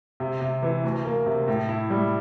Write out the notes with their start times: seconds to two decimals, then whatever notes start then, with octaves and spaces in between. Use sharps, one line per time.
0.20 C3
0.42 C3
0.62 E3
0.84 D2
1.05 A#3
1.26 C3
1.48 A2
1.69 E4
1.90 G3